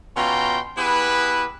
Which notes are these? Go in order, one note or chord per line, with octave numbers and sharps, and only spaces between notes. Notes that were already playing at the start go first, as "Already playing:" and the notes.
B2 C#4 F4 G5 A#5 C6
B3 E4 G4 G#4 B4